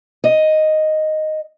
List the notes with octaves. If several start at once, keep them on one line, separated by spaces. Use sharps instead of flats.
D#5